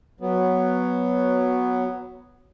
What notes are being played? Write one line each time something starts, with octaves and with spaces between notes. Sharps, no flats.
F#3 B3